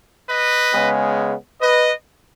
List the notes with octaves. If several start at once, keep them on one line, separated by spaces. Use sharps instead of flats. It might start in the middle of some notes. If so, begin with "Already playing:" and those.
B4 D#5
C#3 G#3 B3
B4 D#5